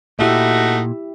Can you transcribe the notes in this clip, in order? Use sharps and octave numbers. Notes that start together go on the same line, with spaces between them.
A#2 A3 D#4 E4 F#4 G4 E5